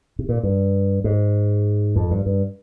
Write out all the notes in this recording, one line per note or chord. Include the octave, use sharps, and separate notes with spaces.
C3
A#2
G2
G#2
F2
G2
G2